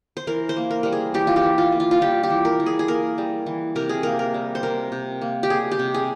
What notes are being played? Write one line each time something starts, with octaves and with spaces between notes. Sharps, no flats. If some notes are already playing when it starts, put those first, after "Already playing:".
C5
E3 A#4
C5
A#3
A#4
G3 A#4
G#4
E3 G4
F4
G4
E3
F4
A#3
F4
F4
G3 G4
G4
E3
A#4
E3
G#4
G#4
A#3 A#4
G3
E3
C3 A#4
G#4
A#3 A#4
A#4
G3
C5
C3 A#4
C3
A#3
G4
G3 G#4
G4
C3
G#4